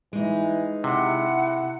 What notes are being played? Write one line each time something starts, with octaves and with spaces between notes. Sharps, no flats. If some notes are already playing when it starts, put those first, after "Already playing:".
E3 G#3 D#4
C3 E4 F#5